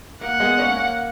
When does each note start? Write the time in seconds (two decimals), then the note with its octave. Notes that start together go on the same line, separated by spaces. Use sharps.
0.21 A#3 F#5
0.40 G#3 B3
0.58 A#3 C#4
0.77 A#3